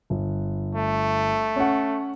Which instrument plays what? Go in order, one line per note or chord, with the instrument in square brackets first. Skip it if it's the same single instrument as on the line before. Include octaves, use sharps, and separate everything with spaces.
[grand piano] G1
[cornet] A3
[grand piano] C#4 F#5